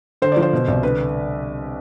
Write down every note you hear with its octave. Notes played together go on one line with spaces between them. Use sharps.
D3 C5
D5
F3
C5
B2
C2
D3 B4